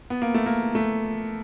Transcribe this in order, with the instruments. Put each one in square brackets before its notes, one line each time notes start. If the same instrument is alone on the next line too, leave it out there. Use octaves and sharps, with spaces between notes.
[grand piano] B3
A#3
A3
A#3
A3